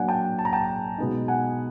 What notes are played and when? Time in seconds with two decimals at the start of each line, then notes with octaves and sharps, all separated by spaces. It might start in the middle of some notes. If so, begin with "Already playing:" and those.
Already playing: F#3 A#3 D4 F#5 G#5
0.08 G5 A5
0.39 A5
0.45 A#5
0.53 G5 A5
0.98 B2 G#3 B3 D#4
1.28 F#5 G#5